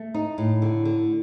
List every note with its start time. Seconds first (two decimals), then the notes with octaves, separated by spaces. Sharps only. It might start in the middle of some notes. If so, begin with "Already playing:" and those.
Already playing: A3
0.14 D#4
0.38 A2
0.62 D3
0.85 D3